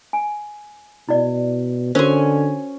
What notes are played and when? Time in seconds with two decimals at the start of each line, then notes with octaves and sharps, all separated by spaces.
0.13 G#5
1.09 B2 E4 D5 D#5
1.95 D3 C#4 F#4 A#4 C5 G#5